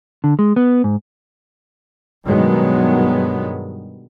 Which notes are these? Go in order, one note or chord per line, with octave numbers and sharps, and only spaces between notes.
D3
G#3
B3
G#2
G2 B2 D#3 F#3 G#3 B3